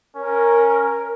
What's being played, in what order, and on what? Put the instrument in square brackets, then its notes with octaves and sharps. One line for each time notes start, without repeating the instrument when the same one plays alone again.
[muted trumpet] C#4 [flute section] A#4